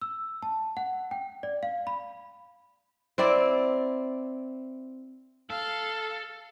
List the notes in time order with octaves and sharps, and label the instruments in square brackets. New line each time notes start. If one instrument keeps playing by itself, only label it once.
[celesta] E6
A5
F#5
G5
D5
F5
B5
[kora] C4 E4 D5
[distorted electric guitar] A4 [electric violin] F5